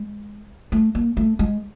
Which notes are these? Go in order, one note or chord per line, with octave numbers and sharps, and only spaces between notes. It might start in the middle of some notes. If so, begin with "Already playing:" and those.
Already playing: G#3
A3
A#3
A3
G#3